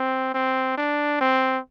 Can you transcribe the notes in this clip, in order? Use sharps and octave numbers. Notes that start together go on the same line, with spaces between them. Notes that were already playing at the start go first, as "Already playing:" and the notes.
Already playing: C4
C4
D4
C4